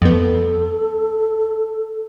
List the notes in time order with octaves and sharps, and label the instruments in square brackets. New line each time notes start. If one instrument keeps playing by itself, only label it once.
[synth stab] F2 B3 [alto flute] A4